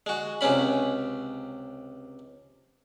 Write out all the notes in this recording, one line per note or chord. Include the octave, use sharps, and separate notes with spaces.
G#3 F#4
C#2 C3 G#3 C#4 B5